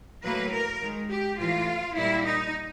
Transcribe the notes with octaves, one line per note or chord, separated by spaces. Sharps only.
A2 F#3 A#3 B4
A#4
D#3 G#3
G4
A2 E3 A3 F4
A#2 G3 A#3 E4
D#4